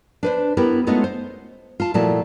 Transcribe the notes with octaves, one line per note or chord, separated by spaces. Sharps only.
D4 B4 C5
B3 E4 G4 A#4 G5
G#3 A3 B3 C#4 D#4 F4
C5
F4 A5
A#2 F3 A3 E4 F#4 A5